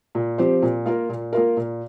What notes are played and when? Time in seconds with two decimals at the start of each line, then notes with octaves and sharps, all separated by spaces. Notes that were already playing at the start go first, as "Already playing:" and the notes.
0.15 A#2
0.38 F3 C4 G4 C5
0.62 A#2
0.86 A#3 F4 A#4
1.09 A#2
1.33 A#3 F4 A#4
1.57 A#2